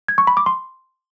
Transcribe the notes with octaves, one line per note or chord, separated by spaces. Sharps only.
G#6
C#6
B5
D6
C6